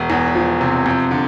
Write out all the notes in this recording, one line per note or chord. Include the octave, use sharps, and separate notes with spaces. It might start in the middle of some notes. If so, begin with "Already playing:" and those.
Already playing: E1
E2
F3
C3
F2
D3